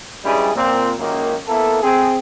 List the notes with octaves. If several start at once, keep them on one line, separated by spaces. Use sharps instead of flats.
G2 G3 G#3 C#4 E4 G#4
A#2 A#3 C4
C#2 F#2 D#3 A#3
A#3 B3 E4 A4
C4 G#4